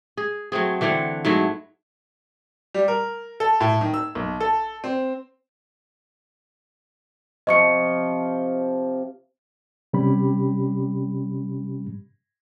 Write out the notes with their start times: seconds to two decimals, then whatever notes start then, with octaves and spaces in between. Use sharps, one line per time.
0.17 G#4
0.52 F#3 A3 C4 G#4
0.81 D3 E3 C4 F#5
1.25 G#2 F#3 A3 E4
2.74 G3
2.88 A#4
3.40 A4
3.61 A2
3.81 D#3
3.94 E6
4.15 B1
4.40 A4
4.84 C4
7.47 C3 F3 D#5 C#6 C#7
9.93 C3 G3 C#4 G4 B5